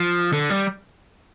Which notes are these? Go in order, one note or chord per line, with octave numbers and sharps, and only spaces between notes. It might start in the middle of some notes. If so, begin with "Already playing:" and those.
Already playing: F3
D3
G3